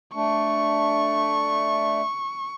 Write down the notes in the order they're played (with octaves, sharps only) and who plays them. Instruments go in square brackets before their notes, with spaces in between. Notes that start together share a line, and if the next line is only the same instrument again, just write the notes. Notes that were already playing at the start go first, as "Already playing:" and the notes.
[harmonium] A3 D4 [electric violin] C#6